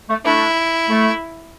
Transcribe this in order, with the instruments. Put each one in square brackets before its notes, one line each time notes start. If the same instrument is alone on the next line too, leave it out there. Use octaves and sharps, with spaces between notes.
[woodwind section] A3
[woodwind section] A3 D4 [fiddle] E4
[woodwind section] A3